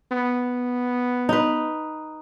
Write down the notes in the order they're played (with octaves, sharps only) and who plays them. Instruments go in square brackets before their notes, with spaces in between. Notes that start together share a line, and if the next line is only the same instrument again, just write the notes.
[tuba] B3
[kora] D#4 B4